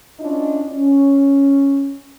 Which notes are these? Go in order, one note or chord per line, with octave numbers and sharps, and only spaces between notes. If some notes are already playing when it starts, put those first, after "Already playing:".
C#4 D4 E4 F4 D#5
C#4